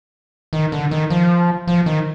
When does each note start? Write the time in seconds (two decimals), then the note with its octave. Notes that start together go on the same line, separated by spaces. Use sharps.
0.53 D#3
0.72 D3
0.91 D#3
1.10 F3
1.68 F3
1.86 D#3